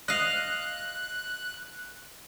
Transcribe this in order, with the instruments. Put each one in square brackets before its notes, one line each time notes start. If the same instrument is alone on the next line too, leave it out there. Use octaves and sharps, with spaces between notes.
[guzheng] D#5 F5 [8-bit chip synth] F#6